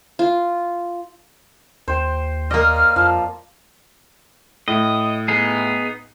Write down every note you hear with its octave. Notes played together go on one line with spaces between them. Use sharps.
F4
D#2 C5 G5
A#3 D5 D#5 F6
F2 F3
A2 D#5
B3 D#4 G#4